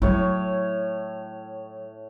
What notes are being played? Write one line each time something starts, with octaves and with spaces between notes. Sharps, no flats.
A2 F#3 E4 C#5